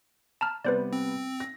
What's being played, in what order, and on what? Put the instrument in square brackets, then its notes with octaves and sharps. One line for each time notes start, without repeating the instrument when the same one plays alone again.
[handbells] A5 A#5 F6
[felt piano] C3 G3 B3 [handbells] B4 C5 D5
[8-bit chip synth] C4
[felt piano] A#6